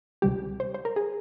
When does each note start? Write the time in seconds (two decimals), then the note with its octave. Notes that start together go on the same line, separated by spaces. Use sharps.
0.22 C#2 C3 G3 G4
0.60 C5
0.74 C5
0.85 A#4
0.96 G#4